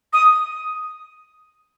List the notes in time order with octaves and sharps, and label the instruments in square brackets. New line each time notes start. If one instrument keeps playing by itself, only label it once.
[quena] D#6